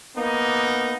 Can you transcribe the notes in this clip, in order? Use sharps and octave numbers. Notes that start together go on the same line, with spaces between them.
A#3 B3 D#4